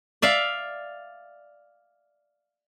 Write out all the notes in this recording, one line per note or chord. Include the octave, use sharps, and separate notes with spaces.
D5 E5 F5